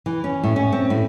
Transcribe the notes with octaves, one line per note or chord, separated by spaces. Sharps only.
E3
C#4
A2
C#4
C4
A2